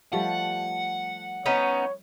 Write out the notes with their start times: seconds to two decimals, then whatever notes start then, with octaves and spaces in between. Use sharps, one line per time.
0.13 F3 G3 A3 F#5
1.46 B3 C#4 D#4 C#5